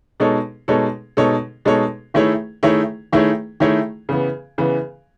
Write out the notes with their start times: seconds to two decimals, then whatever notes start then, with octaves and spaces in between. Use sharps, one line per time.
0.20 B2 G#3 D#4 A4 C#5
0.68 B2 G#3 D#4 A4 C#5
1.17 B2 G#3 D#4 A4 C#5
1.65 B2 G#3 D#4 A4 C#5
2.14 D#3 A3 E4 G#4 C#5
2.63 D#3 A3 E4 G#4 C#5
3.13 D#3 A3 E4 G#4 C#5
3.60 D#3 A3 E4 G#4 C#5
4.09 C#3 E3 B3
4.58 C#3 E3 B3